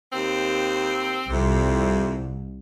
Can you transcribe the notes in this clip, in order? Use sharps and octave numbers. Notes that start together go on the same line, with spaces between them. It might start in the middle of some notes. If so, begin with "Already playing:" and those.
D#2 C4
C2 F2 C3